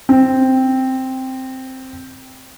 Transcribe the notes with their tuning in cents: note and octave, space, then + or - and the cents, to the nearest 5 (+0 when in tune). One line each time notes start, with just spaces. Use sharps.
C4 +0